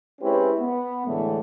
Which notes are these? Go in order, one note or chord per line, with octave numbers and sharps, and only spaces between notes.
G#3 C4 C#4 E4 G4 B4
B3
A2 D3 E3 G#3 A3